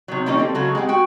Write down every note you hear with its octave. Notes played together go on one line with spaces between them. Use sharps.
C3 D#3 F#3
E3 F3 G3 A#3 C#4 D#4
G3 C4 A4
C#3 F#3 G#3 F#4 G#4 A4
G#3 C4 G4 F#5
F#4 G5